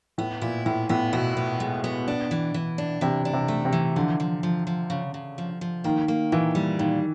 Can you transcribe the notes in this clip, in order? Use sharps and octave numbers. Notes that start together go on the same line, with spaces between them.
A2 B3
A#2 E4
A2 B3
A2 B3
B2 E4
B3
G#3
B3
D4
E3
E3
D4
C3 E3
D4
C3
A3
C3
E3
D3 F3
F3
F3
F3
C#3
C#3
F3
F3
D#3 A#3
A#3
A#2 E3
G3
A#2 D#3